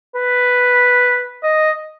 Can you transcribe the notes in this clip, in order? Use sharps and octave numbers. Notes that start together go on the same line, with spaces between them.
B4
D#5